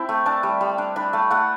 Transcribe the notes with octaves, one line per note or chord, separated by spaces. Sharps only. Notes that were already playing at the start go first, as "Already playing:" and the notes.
Already playing: C4 E4 G5 A5
A3
D4 A5
G3
G3
D4
D4 B5
A3 A5
A3 F#5